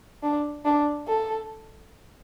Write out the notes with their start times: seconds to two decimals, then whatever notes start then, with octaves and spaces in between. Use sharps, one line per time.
0.23 D4
0.65 D4
1.08 A4